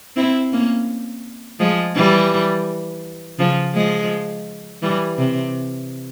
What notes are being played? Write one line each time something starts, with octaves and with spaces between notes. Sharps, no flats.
C4 E4
A#3 C#4
F3 G#3
E3 G3
C#3 F3
F3 G#3
E3 G3
C3